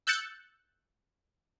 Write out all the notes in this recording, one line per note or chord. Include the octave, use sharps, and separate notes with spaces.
E6 F#6 G6 A6 C#7